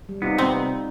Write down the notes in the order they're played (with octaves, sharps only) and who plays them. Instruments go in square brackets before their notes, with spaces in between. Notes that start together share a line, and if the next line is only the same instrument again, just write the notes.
[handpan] G3
[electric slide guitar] C3 B3 [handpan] D#4 F4
[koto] C4